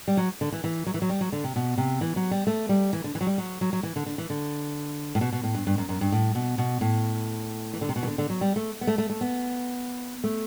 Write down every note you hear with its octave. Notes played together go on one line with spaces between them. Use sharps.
G3
F#3
D3
E3
E3
F#3
E3
F#3
G3
F#3
D3
C3
B2
C3
E3
F#3
G3
A3
G3
E3
D3
E3
F#3
G3
F#3
F#3
F#3
E3
D3
D3
E3
D3
A2
B2
B2
A2
G2
G2
F#2
F#2
G2
A2
B2
B2
A2
E3
D3
C3
B2
E3
D3
D3
F#3
G3
A3
B3
A3
A3
A3
B3
A3